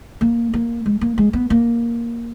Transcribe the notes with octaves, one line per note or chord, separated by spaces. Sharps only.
A#3
A#3
G#3
A#3
G#3
B3
A#3